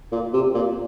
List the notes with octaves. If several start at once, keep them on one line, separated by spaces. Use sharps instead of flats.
A#2
C3
A#2